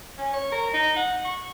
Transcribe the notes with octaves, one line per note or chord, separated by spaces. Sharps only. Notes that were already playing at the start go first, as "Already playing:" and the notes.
C#4
C#5
A#4
D#4
F#5
C#6